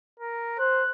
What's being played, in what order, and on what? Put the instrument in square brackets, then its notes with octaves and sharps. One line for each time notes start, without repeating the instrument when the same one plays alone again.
[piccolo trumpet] A#4
[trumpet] C5 [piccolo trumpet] F#6